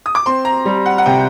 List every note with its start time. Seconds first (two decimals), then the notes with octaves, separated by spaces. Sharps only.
0.06 D#6
0.15 D6
0.26 C4 C6
0.45 A#5
0.65 G3
0.86 F#5
0.98 F#5
1.06 C3 G5